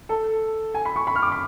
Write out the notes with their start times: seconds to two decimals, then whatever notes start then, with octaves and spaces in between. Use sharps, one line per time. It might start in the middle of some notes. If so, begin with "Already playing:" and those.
0.09 A4
0.74 G#5
0.85 B5
0.96 C#6
1.07 B5
1.15 F6
1.22 D6
1.32 B5